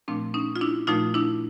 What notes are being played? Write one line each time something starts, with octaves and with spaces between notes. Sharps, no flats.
A#2 F3 A3 C4 D4
C#4 D#4
F4
D4 E4
A#2 F3 A3 D#4 F4
D4 E4